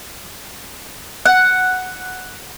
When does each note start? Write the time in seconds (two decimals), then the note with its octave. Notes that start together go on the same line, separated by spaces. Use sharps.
1.26 F#5